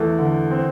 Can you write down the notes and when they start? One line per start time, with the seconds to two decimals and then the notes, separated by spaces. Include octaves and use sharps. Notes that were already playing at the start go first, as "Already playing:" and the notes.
Already playing: E2 A3
0.19 D3
0.51 C4